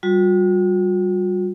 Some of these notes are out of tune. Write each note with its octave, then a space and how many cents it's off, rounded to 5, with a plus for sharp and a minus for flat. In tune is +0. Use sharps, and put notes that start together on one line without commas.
G3 -15 F#4 -45